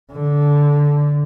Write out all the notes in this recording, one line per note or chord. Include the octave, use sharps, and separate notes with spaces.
D3